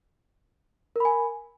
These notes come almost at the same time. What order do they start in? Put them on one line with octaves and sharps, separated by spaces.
A#4 B5 G#5